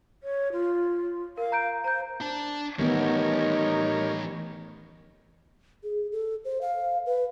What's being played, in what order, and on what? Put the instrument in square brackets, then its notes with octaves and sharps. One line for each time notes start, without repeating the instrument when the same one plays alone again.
[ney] C#5
F4
[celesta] A#4 [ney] F5
[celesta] A#5 G6 D7
[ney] C5 [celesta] A#5 G6
[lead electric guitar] D4 A5
[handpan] D#3 B3 [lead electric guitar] E3 A3 [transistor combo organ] G3 A#4 C#5 [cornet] D#4
[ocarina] G#4
A4
C5
F5
B4